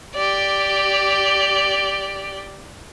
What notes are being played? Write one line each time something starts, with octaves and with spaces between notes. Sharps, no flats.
G4 D5